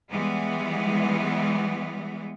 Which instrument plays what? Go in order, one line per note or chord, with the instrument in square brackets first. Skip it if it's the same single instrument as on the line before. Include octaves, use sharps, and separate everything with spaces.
[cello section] E3 G3 G#3 B3